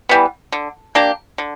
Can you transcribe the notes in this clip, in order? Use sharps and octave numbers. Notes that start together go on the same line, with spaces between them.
E3 G3 B3
D3
A#3 D4 G4
D3